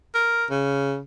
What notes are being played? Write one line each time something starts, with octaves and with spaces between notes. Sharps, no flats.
A#4
C#3